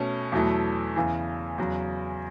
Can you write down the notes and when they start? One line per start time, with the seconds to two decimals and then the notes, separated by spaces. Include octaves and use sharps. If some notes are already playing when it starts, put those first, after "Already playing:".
Already playing: B2 A3 C#4
0.32 E2 B2 F#3 A3 E4
0.96 E2 C#3 E3
1.58 E2 C#3 F#3